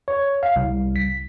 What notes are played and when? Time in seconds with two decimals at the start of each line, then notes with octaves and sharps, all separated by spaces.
0.08 C#5
0.43 F5
0.56 C2
0.96 B6